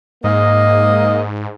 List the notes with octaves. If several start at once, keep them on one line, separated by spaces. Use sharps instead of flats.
G#2 A#3 D#5